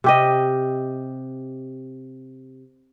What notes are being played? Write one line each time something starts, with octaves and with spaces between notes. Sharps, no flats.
C3 G4 D#5